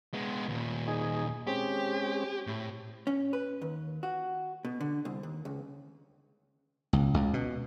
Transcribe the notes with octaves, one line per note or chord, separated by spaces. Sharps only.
G#3 B3
D#2 A#2
D#4 G#4
G#3 C4 C#4 G4
A2
C#4
B4
D#2
F#4
B2
D3
C2
D#2
C#2
C#2
C#2
B2